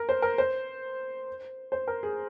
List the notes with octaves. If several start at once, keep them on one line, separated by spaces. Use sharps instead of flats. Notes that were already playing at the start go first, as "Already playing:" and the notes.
Already playing: A#4
C5
A#4
C5
C5
A#4
G#4